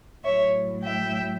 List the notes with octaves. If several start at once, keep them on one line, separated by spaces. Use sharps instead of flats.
A2 F#3 C#5 E5
E5 G5